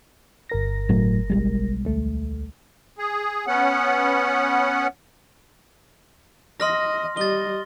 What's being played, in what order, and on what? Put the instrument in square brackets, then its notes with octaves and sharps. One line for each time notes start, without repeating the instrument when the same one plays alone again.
[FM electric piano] G1 A#4 A#6
[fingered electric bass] A2 F#3 A3
B1 G3 G#3
[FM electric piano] D2 A3
[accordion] G#4
B3 C#4 F#5
[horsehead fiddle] D#5 [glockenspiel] C6 F6 A#6
[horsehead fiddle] G3 D#5 [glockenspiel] A6 G7